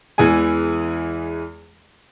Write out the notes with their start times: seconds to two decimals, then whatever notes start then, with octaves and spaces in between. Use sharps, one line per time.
0.18 E2 E3 G#3 G#4 G#5